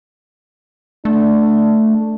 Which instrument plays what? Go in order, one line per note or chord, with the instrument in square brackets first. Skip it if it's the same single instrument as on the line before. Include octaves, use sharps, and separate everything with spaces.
[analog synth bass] A3 [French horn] D4